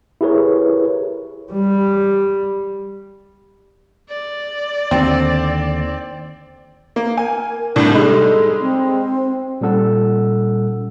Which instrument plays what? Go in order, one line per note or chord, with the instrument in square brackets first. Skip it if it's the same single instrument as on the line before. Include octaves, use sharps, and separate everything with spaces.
[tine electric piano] E4 G4 G#4 A#4 B4 C#5
[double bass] G3
[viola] D5
[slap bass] D#2 D3 [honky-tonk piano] C4
[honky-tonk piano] A#3
[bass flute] A#4 [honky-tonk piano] G#5
[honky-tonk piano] C2 A2 [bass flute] D4
[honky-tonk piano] G3 G#3 D#4 [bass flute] A4
[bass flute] C4
[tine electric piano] A#2 G3 C#4 A4 F#5 E6